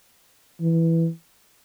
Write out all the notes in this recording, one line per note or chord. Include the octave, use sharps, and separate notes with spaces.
E3